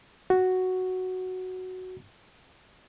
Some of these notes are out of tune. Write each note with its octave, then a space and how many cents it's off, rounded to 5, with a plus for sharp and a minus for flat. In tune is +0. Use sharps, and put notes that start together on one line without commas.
F#4 +0